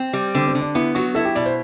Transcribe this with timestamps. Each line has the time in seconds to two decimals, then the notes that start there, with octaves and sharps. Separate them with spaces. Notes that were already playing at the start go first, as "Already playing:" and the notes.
Already playing: C4
0.13 G3
0.35 D3 C4
0.48 C4
0.55 D3
0.61 D4
0.75 B3 E4
0.95 F#3 F#4
1.15 E4 A4
1.25 G4
1.35 B2 D5
1.46 C5